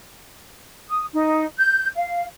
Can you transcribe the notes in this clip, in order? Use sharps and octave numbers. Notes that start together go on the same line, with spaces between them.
D#6
D#4
G6
F5